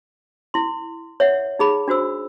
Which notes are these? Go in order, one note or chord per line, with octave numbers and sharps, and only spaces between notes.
E4 C6
C#5 E5 F#5
D#4 G#4 B5
D4 F#4 C5 E6